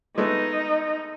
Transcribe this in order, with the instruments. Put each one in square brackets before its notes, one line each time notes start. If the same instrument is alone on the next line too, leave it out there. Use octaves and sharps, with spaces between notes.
[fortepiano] G#3 A3 B3 [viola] D#4